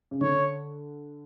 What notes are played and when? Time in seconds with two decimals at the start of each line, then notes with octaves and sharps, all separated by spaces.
0.11 C#3
0.21 D3 C#5